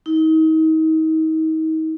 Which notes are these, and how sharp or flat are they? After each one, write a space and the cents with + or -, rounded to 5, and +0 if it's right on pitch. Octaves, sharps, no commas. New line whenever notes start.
D#4 +35